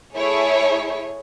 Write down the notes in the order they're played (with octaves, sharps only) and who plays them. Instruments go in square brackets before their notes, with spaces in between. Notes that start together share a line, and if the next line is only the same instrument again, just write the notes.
[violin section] A3 E4 G#4 C#5